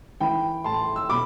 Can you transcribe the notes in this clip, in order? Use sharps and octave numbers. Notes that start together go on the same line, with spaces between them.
E3 G5 B5
A2 A5 C6
E6
B2 B5 D6